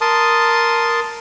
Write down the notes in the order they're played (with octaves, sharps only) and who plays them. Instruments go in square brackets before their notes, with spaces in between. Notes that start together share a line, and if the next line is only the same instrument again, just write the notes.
[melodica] A#4 A5 C6 D#6